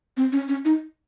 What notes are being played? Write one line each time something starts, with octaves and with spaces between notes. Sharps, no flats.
C4
C#4
C#4
D#4